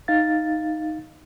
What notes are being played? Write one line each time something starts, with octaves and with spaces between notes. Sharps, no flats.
D#4 F5 A6